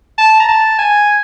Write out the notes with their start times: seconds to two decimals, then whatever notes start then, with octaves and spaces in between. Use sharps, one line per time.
0.18 A5
0.40 A#5
0.48 A5
0.79 G#5